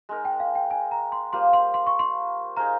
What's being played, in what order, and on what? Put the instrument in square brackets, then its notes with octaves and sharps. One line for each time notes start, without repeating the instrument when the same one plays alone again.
[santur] G#3 D#4 A#4
[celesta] G5
F5
G5
G#5
A#5
C6
[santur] G3 A#3 F4 C5 [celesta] C6
[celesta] C6
C6
C#6
C6
[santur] D#4 G#4 C5 F5 [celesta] A#5